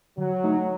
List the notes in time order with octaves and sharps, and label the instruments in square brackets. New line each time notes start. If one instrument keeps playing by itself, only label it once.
[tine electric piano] D3 [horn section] F#3
[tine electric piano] A3 D#4